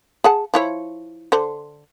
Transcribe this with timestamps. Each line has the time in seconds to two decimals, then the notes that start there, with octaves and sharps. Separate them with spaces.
0.24 G#4 F#5 A5
0.54 F3 E4 C#5
1.32 D3 C5